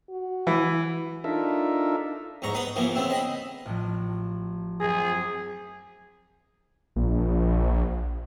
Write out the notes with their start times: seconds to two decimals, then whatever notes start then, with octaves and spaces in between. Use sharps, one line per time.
0.10 F#4
0.47 E3
1.24 D4 D#4 F4 A4 A#4 E5
2.42 E2 G#2 A#5 C#6
2.54 B3 B4 B5 D#6
2.76 E3 F3 A#3 B3
2.95 C#3 B3 C4 E4
3.10 D#5 B5
3.66 A1 A2 F3
4.80 F#2 C4 G#4 A#6
6.96 A#1